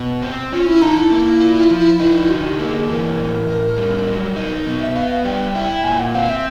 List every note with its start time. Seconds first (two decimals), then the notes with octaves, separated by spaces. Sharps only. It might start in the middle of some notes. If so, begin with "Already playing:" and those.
Already playing: B2
0.22 C4
0.52 C#4 F4
0.66 E4
0.82 D#4 A4
0.97 E4
1.12 A#3
1.40 F4
1.71 F3
2.00 D#4
2.29 D3 F#4
2.50 G4
2.59 A#3
2.68 G#4
2.89 E3 A#4
3.18 A2
3.48 A2
3.77 G3
4.07 F#3
4.36 D#4
4.66 B2
4.81 E5
4.96 B3 F5
5.11 F5
5.25 G3 G5
5.54 E4 G5
5.78 G5
5.84 A#2 G#5
5.99 F#5
6.15 C4 F5
6.29 E5